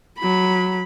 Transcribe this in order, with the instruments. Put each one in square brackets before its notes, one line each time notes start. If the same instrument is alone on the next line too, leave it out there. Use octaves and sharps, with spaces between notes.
[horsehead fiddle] F#3 B5